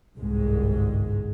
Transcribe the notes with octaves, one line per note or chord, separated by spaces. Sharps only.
G1 C2 G#2 G#3